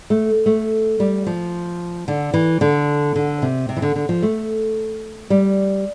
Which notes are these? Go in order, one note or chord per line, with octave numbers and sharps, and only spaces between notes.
A3
A3
G3
F3
D3
E3
D3
D3
C3
C3
E3
D3
D3
F3
A3
G3